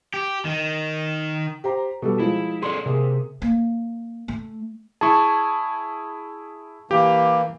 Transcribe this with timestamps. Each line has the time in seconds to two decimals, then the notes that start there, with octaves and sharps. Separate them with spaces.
0.14 G4
0.45 D#3
1.64 G4 C5 A#5
2.02 B2 G3 A4
2.19 F3 G#3 E4
2.62 G#4 A4 D5 C6
2.86 C3 A#3 G#4
3.42 A#3
4.28 A3
5.01 E4 G#4 A5 C#6
6.91 E3 A#3 G4